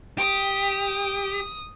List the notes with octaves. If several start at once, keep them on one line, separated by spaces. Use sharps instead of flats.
G4 D#6